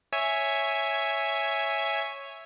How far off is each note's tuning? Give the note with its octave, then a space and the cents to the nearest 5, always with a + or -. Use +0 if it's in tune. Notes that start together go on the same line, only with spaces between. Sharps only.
C#5 +0 E5 +0 G#5 +0